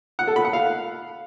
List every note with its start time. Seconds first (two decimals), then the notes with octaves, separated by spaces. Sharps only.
0.19 F#5
0.27 A4
0.36 B5
0.45 F#5
0.53 F5